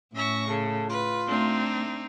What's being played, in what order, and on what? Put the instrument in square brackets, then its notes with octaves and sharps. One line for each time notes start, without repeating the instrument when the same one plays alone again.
[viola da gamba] A2 [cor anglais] C#4 [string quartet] E5 C#6 A#6
[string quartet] C#3 [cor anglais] A4
[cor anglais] F4 [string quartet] B4
[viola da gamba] A3 [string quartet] C4 D4 D#4